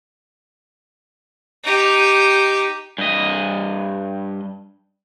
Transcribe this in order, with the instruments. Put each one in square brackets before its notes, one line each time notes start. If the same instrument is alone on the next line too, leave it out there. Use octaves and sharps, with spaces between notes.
[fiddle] D#4 G4
[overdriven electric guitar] G2 D#5